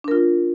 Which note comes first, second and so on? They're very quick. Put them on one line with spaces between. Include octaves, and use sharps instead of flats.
D4 A#4 F4